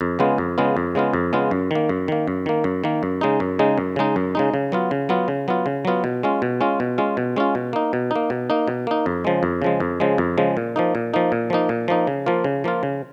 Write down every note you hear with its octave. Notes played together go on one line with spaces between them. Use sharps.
F2
C#3 G#3 B3 F4
F2
C#3 G#3 B3 F4
F2
C#3 G#3 B3 F4
F2
C#3 G#3 B3 F4
F#2
D#3 A#3
F#2
D#3 A#3
F#2
D#3 A#3
F#2
D#3 A#3
F#2
C#3 G#3 D#4
F#2
C#3 G#3 D#4
F#2
C#3 G#3 D#4
F#2
C#3 G#3 D#4
C#3
F#3 B3 F4
C#3
F#3 B3 F4
C#3
F#3 B3 F4
C#3
F#3 B3 F4
B2
G#3 C#4 F4
B2
G#3 C#4 F4
B2
G#3 C#4 F4
B2
G#3 C#4 F4
B2
A#3 D#4
B2
A#3 D#4
B2
A#3 D#4
B2
A#3 D#4
F2
C#3 F3 G#3
F2
C#3 F3 G#3
F2
C#3 F3 G#3
F2
C#3 F3 G#3
A#2
F3 A#3 D#4
A#2
F3 A#3 D#4
A#2
F3 A#3 D#4
A#2
F3 A#3 D#4
C#3
F3 A#3 F4
C#3
F3 A#3 F4
C#3